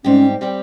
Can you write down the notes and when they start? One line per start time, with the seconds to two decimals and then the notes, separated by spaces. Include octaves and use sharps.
0.04 G#2 G3 C4 C#4 G4
0.41 G3 C4 G4